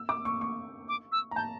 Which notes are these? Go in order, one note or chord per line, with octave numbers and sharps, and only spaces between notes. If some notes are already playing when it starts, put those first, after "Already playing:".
Already playing: E6
D6
C#6
C#6
D6
E6
A#5
A5 G6